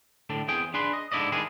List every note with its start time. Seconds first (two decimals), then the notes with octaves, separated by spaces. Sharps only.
0.30 A2 D3 A3 D4
0.48 E2 C4 G#4 G5
0.74 D4 G#4 B4 C6
0.93 D#5
1.12 G#2 D3 D4 E4 D5 D#5
1.32 D#3 E3 G3 G#3 D4 G#4